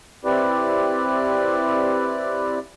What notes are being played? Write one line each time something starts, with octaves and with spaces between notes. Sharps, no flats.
C4 E4 G4 B4 D5